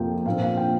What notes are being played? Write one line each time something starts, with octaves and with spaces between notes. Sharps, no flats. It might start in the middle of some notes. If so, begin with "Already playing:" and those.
Already playing: F2 C3 F3 A#3 G5
A#2 F3 C4 F5
F5
G5